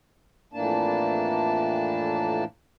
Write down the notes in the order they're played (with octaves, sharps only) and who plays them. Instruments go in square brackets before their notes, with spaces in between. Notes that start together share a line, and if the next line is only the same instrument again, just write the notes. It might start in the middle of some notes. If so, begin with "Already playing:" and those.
[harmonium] F2 A2 E3 A#3 D4 A5